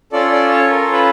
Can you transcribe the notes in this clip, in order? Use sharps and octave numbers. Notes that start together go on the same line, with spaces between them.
C#4 F4 A4 D5
D5
C#5
A#4
B4